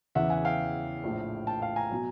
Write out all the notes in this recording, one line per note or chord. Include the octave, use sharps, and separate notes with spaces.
E2 C#3 E3 E5 F#5
F#5 G#5
F5 G5
A#1 A2 F3
G5 A5
F5 G5
G#5 A#5
B2 F#3